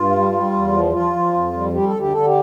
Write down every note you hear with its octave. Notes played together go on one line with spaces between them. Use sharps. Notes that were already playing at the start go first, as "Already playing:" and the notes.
Already playing: G2 F4
G3
G3
E2
F3
F3 F4
F3
F2
G3
G3 G4
A4
D2
G4
D3 A4
G4